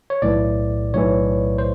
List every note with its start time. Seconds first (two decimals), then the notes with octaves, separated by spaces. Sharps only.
0.10 C#5
0.22 B1 A2 E3 D5
0.94 B1 A2 E3 C#5
1.58 C5